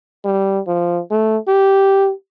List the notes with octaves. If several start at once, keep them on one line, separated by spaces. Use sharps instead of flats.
G3
F3
A3
G4